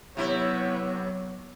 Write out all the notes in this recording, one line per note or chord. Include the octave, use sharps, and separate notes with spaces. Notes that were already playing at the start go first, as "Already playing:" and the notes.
C3 F#3 B3 E4 C#5